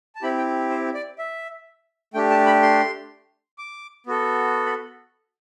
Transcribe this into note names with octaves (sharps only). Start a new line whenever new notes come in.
A5
C4 E4 G4 B5
G5
C5
D5
E5
A3 D4 G4 G5
A5
B5
C6
D6
B3 F#4 A4
B5